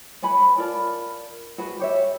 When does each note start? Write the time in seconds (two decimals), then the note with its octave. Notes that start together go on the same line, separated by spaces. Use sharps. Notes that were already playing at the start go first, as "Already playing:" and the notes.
0.22 B4 C#5 G#5 B5
0.57 F4 A#4 D5 A5
1.58 F#4 G#4 B4
1.79 G4 C#5 E5